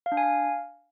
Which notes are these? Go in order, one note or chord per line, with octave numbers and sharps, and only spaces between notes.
F5
D4
G#5
F5